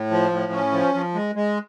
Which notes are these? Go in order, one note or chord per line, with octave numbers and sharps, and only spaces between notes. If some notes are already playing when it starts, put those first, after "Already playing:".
Already playing: A2
F3
A2
C#4
F3
F3
G#3
G#3